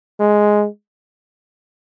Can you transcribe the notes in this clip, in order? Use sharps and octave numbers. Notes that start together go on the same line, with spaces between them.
G#3